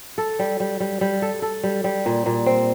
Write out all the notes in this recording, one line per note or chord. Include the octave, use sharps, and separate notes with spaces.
A4
G3
G3
G3
G3
A4
A4
G3
G3
A#2
A#2
C4